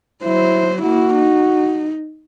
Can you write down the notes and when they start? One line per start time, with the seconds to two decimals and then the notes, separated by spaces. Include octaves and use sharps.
0.24 F#3 E4 C5
0.82 A#3 E4 F#4
1.14 D#4